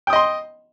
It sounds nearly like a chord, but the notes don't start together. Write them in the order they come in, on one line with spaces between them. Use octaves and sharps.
G5 D#6 D#5 C6